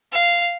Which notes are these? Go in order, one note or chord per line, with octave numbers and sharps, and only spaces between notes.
F5